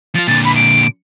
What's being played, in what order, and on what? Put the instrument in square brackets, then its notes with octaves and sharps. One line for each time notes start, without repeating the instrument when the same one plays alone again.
[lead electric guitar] F3 F4 [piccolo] A6
[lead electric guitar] A#2 D3 [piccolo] A6
[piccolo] B5
D7